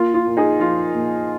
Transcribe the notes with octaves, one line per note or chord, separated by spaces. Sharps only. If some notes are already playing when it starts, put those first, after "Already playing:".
Already playing: A#3 F4
F4
A#2
D#4 G#4
F3 F4
A#2